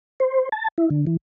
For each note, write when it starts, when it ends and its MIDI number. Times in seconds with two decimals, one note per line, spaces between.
0.20 0.49 72
0.52 0.68 81
0.78 0.89 64
0.90 1.05 50
1.07 1.17 52